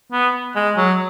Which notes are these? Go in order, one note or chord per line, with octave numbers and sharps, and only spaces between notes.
B3
G#3
F#3